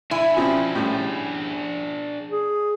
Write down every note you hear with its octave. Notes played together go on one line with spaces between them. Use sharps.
D4 E4 G#4 G#5
C#3 F3 C4
A2 C#3 G3
G#4